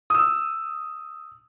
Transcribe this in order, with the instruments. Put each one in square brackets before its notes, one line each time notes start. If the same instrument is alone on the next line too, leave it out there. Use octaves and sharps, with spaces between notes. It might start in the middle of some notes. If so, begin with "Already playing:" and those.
[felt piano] D#6 E6